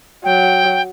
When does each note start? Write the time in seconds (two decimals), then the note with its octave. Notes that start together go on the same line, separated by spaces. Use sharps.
0.24 F#3 G5